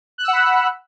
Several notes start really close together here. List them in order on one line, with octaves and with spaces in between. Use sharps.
F#6 E6 F#5 B5